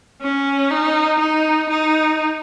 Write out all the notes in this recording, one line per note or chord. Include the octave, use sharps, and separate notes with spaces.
C#4
D#4
D#4
D#4